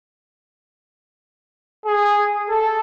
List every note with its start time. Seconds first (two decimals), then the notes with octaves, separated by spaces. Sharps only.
1.85 G#4
2.49 A4